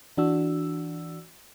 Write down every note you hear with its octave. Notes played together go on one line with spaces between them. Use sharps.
E3 D4 F#4 E6